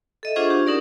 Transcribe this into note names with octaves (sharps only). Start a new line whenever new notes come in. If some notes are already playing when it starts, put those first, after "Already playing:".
A4 D#5 E5
D4 F4 G#4 C5 F#5 C#6
D4 G4 F#5
C#4 D#4 A#4 D5